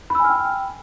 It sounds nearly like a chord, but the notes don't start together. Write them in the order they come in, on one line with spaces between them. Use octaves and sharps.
B5 E6 G#5 F6 G5